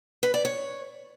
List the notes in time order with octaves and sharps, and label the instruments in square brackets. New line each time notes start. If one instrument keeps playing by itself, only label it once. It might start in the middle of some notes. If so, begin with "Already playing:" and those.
[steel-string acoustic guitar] B4
D5
C#5